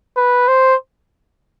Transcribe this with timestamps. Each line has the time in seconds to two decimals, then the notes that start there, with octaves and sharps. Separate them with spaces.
0.17 B4
0.48 C5